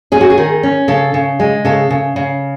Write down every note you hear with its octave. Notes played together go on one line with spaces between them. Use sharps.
C#4 G#4
F#4
G#4
D#3
C#4
C#3 A4
C#3
G#3
C#3 A4
C#3
C#3